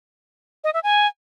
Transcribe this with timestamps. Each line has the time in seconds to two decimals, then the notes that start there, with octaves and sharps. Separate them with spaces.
0.64 D#5
0.74 E5
0.84 G#5